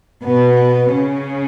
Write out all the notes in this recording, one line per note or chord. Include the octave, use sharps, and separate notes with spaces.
B2 B3
C#3 C#4